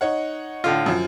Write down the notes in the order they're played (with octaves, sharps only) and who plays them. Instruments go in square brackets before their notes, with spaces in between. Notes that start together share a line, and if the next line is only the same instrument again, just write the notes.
[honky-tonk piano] D#4 C#5 F#5
[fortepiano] A2 D3 F4
[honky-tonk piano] F#2 F3